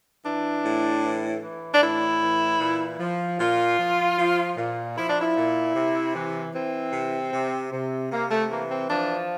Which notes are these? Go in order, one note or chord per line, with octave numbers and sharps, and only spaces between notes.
E3 D4
A2
E3
E3
D4
A2 E4
E3
A#2
F3
A#2 F4
F3
F3
A#2
F3 E4
D4
E4
A#2
C3
E3
E3 C4
C3
C3
C3
C3 A#3
A3
E3 A#3
C4
F3 D4